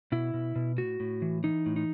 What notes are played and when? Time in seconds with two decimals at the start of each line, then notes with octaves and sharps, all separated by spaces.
0.12 B2 E4
0.34 B2
0.56 B2
0.78 A2 F#4
1.00 A2
1.22 E3
1.44 E3 D#4
1.66 A2
1.76 D#4